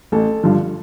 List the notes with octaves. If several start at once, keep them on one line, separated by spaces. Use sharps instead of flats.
A1 A4
G2 D3 F3